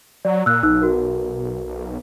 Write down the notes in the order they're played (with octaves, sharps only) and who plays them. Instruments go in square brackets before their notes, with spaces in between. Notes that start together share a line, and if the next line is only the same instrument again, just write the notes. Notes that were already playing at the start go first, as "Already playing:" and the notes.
[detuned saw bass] F#3 [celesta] D5
[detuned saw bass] A#2 [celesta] E6 F#6
[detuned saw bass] B1 [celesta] D#4 E6 F#6
[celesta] F#4 A#4
[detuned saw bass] B1